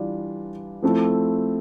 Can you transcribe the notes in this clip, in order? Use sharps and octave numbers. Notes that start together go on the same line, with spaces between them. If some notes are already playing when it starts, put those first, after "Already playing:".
Already playing: E3 G3 D4 F4
F3 A3 C4 E4 A4